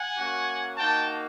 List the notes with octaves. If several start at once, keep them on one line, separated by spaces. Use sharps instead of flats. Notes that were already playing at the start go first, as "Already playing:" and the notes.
Already playing: F#5 G#5
A#3 C#4 F#4
A#3 D#4 F#4 G5 A5